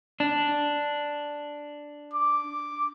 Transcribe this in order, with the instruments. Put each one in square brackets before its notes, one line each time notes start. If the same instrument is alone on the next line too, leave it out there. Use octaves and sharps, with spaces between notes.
[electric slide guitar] D4
[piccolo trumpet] D6